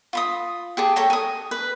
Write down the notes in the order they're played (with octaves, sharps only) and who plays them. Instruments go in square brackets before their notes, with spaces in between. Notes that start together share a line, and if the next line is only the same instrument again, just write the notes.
[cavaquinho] F4 B5 D#6
G4 G#4 A5
A4 C#5 G5 A#5
G#5 D#6
B4